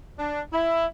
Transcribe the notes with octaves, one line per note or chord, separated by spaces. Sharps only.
D4
E4